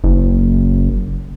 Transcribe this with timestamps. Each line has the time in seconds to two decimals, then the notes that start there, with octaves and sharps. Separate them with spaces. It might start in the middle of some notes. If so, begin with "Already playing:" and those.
0.04 F#1